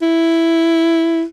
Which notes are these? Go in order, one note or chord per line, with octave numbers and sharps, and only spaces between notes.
E4